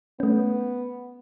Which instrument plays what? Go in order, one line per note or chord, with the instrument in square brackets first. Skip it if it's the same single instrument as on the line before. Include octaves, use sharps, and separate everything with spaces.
[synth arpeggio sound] A3 C#4 [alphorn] B3